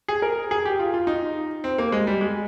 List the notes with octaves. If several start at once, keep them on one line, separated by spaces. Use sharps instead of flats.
G#4
A#4
G#4
G4
F4
F4
D#4
C4
A#3
G#3
G3
G#3